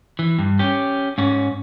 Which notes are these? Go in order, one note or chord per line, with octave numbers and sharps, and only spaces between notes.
E3
G2
C#4 G4
G#2 C#4